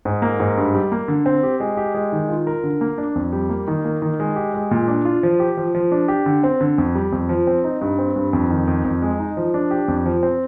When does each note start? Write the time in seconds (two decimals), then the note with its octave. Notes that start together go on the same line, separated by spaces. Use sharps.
0.05 G#2
0.22 A#3
0.40 G#2
0.57 G2
0.74 G3
0.92 A#3
1.08 D3
1.26 C4
1.43 G4
1.60 G#3
1.77 G4
1.94 G#3
2.12 D#3
2.29 F4
2.47 A#4
2.63 D3
2.81 A#3
2.98 D4
3.15 F2
3.33 G3
3.49 A#3
3.68 D#3
3.85 A#3
4.02 D#3
4.20 G#3
4.36 G4
4.54 G#3
4.71 A#2
4.88 D4
5.05 F4
5.23 F3
5.40 G4
5.57 F3
5.75 F3
5.92 D4
6.08 G4
6.26 D3
6.43 C4
6.61 D3
6.78 F2
6.95 G3
7.12 F2
7.29 F3
7.47 C4
7.64 D#4
7.81 G2
7.98 C4
8.16 G2
8.33 F2
8.50 D#3
8.67 F2
8.84 F2
9.02 G#3
9.19 D#4
9.37 F3
9.54 D4
9.71 G4
9.88 F2
10.06 F3
10.23 C4